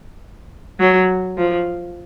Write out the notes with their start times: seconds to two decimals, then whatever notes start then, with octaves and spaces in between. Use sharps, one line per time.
0.80 F#3
1.37 F3